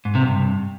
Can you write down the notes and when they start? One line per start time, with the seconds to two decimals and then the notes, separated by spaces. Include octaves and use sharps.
0.05 G#2
0.15 C3
0.25 G2